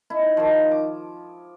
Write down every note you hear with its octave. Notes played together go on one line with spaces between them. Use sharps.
D#4 E4
D#3 F3
D6